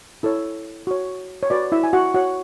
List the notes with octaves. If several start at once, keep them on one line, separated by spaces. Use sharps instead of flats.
E4 A4 C#5
F#4 C#5
C#5
F#4 B4 D5
E4 E5
G#5
F#4 F#5
F#4 C#5 F#5